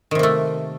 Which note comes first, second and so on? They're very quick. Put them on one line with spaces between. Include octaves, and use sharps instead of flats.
D#3 C3 A#3 A3